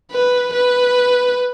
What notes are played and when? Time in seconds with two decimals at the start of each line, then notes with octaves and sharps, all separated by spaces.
0.12 B4
0.53 B4